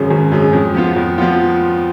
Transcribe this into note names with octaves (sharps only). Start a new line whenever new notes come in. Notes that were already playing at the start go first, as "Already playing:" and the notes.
Already playing: G#1 F#2 C#3 G#3
G#1
F#2 C#3 G#3
F2
F3 B3 F4
F2
F3 B3 F4